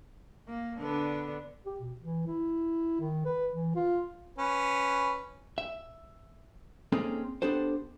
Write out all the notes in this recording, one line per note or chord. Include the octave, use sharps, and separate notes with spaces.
A#3
D3 B3 D4
G4
B2
E3
E4
D#3
B4
E3
F4
C#4 B4
E5
A#3 C4 C#4 D#4 G#4 A4
B3 D4 G4 A4 C5